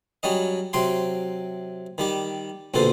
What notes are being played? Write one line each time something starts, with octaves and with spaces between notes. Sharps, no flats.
F#3 G3 C#4 D#5
C3 F#3 G5 C6
D#3 G3 G4
A#1 F2 B2 D3 A4 C5